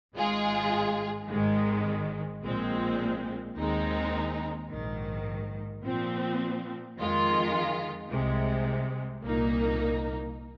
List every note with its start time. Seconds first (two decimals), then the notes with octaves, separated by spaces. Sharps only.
0.15 G#1 G#2 G#3 F4 G#4
1.29 G#1 G#2 D#3 G#3
2.42 A#1 A#2 G#3 C4
3.55 D#2 D#3 G#3 C4 D#4
4.69 A#1 G#2 D#3
5.82 A#2 F3 C4
6.96 F2 D#3 G#3 F4
8.10 C2 C3 G#3
9.23 C2 A#2 A#3 D#4